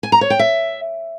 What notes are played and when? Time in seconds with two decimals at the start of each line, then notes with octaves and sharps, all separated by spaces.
0.03 G#5
0.12 A#5
0.21 C#5
0.30 G5
0.39 E5